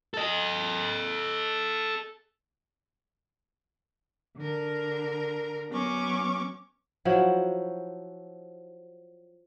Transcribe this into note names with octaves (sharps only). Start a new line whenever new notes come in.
A4 D#5
D3 A#4
F#3 B3 C#4 C#6 D6
F3 F#3 E4 F#4